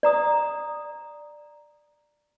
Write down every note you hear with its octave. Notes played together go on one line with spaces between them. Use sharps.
D5 A#5 D#6